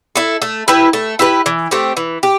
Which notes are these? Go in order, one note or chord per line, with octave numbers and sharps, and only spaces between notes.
E4 A4
A3
E4 G4 B4
A3
E4 G4 B4
E3
A3 C4 G4
E3
G4